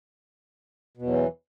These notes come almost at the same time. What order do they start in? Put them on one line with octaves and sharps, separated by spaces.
B2 E2 F#3 E3